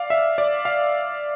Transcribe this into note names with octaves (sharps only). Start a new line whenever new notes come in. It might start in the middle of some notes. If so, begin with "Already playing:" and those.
Already playing: D5 F5
E5
D5
F5